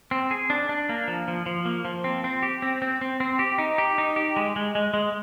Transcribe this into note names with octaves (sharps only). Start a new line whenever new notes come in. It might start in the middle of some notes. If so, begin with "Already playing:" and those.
C4
G#4
D4
D4
A#3
F3
F3
F3
A#3
F3
C4
C4
G4
C4
C4
C4
C4
G4
D#4
G4
D#4
G4
G#3
G#3
G#3
G#3